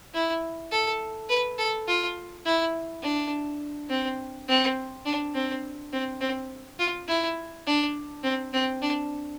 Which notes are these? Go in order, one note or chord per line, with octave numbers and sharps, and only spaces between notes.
E4
A4
B4
A4
F4
E4
D4
C4
C4
D4
C4
C4
C4
F4
E4
D4
C4
C4
D4